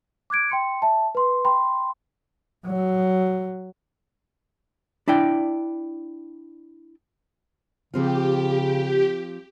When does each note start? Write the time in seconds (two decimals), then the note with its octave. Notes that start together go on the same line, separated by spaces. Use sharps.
0.30 D6 F#6 G#6 D7
0.50 G5 C6 C#7
0.82 E5 A5
1.15 B4 C6
1.45 G5 B5 C6
2.67 F#3
5.08 D4 E4 D5 G5
7.94 C#3 F3 C4 F4 G4